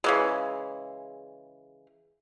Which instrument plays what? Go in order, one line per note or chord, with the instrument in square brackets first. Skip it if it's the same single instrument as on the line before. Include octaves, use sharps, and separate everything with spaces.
[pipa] C#3 E3 G#3